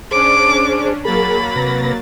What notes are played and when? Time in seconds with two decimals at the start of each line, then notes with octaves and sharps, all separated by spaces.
0.11 C#4 D4 G#4 C5 D6
1.05 F#3 A#3 G#4 A#4 B5 A6
1.56 C3 B4 A#6